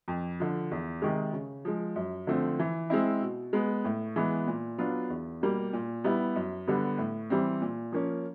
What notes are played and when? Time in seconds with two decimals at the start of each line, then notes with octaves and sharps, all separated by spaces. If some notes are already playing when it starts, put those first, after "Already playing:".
0.08 F2
0.40 D3 F3
0.71 E2
1.02 C3 D#3 G#3
1.33 C#3
1.65 F3 G#3
1.96 F#2
2.27 D3 F3 A3 C4
2.59 E3
2.90 G#3 C4 E4
3.21 B2
3.53 G#3 B3
3.84 A2
4.16 E3 G#3 B3
4.47 A#2
4.78 F#3 B3 D4 F4
5.10 E2
5.41 B2 G3 A#3
5.73 A#2
6.04 G3 B3 E4
6.36 F#2
6.67 D3 G3 B3
6.98 A2
7.30 E3 G3 C4
7.62 A#2
7.92 F3 A#3 C#4